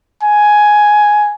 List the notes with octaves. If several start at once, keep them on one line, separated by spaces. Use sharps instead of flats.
G#5